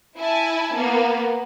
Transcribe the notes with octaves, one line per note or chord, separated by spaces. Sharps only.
E4 G#5 A5
A#3 B3